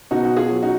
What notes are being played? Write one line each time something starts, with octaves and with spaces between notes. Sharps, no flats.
B2 D#4 F#4
F#4
F4 G#4
F#3
D#4 F#4